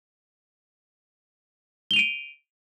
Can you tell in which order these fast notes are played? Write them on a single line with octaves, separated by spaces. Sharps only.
G7 F7 D#7 D7